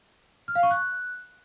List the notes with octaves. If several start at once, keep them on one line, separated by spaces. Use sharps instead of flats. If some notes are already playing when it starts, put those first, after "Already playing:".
F6
F5
C#6
F#6